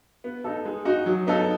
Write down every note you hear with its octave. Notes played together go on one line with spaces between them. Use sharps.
B3
D#4 A4
G#3
D#4 F#4
F#3
B3 D#4 A4